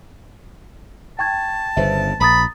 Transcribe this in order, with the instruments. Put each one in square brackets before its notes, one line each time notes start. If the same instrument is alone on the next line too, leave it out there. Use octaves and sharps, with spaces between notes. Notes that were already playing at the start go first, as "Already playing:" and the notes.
[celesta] G5 C#6 G#6 [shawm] A5
[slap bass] G1 C#3 [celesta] B4 C5 E5
[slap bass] A#1 [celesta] A#5 D#6 A6 [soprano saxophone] B5